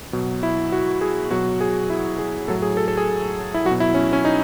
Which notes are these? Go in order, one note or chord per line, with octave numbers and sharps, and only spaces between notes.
B2 F#3
E4
F#4
G#4
B2 F#3 F#4
G#4
E4
G#4
A2 F#3 A4
G#4
A4
A4
G#4
E4
F#3 F#4
B2
E4
C#4
C#4
D#4